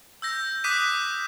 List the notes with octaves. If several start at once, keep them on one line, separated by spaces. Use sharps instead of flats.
E6 G6 A#6
D6 D#6 F#6 B6 D#7 E7